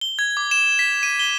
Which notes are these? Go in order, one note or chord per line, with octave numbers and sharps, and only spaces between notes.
G7
G#6
D6
E7
B6
D#7
G7